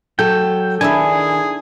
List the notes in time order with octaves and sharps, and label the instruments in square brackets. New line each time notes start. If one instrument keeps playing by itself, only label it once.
[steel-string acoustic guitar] F#3 A4 [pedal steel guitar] G5
[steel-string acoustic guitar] D#3 [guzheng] D4 E4 E5 [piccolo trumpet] G#4 [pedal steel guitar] G#5